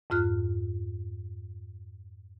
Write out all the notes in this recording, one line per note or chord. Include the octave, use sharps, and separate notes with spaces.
F2 G#2 F4 F6 F#6